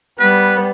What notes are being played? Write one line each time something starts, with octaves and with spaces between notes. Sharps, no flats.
G3 B3 B4